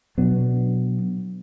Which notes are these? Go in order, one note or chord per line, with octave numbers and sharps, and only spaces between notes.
B2 F#3 B3 D4